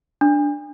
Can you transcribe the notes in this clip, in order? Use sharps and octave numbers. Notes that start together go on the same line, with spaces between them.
D4